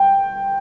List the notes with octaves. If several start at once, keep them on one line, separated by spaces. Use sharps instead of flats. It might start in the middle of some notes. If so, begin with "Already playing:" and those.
Already playing: G5